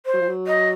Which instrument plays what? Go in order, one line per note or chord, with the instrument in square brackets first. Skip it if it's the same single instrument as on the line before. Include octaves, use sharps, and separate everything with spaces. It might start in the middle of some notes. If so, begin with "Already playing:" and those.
[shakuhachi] C5
[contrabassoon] F#3
F3
F#3
[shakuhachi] D#5